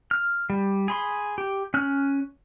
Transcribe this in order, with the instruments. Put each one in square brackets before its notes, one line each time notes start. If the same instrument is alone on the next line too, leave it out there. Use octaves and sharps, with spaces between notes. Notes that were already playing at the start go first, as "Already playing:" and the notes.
[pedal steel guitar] F6
G3
G#4 B5 C6
G4
C#4 F6 F#6